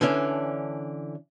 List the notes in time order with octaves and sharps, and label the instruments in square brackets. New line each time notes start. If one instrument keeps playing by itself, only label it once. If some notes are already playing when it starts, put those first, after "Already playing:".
[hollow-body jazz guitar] D3 E3 C#4 D4